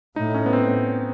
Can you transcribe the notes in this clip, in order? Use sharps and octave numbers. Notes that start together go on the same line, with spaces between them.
A2 D#4
C#4
B3
C4